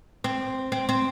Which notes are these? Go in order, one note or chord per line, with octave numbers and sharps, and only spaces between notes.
C4
C4
C4